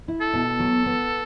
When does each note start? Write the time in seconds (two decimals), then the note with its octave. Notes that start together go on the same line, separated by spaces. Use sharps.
0.08 E4
0.21 A4
0.33 B2
0.59 F#3
0.86 B3